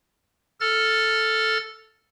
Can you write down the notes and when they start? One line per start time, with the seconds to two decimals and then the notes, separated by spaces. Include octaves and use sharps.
0.61 A4 F6 A6